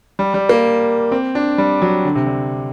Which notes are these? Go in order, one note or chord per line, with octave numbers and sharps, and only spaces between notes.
G3
G3
A#3
C4
D4
G3
F#3
D3
C3
D3